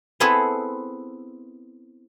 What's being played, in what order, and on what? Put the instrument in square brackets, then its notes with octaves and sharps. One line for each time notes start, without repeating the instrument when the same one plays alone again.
[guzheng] B3 C4 E4 G#4 A4 B4